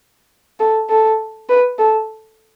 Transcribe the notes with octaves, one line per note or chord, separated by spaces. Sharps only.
A4
A4
B4
A4